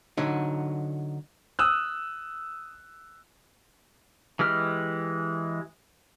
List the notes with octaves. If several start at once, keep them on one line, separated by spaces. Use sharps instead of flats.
D3 F#3 D#4
D#6 E6 F#6
E3 G#3 G4 F6